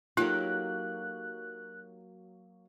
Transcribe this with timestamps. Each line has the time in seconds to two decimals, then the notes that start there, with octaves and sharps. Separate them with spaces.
0.17 F#3 A#3 D#4 F4 G4 A4 F#6